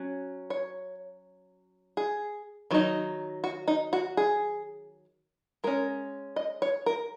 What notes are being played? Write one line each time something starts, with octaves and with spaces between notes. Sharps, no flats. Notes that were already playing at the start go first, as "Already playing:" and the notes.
Already playing: F#3 C#4
C#5
G#4
D#3 F#3 D#4
F#4
D#4
F#4
G#4
G#3 C#4 A#4
D#5
C#5
A#4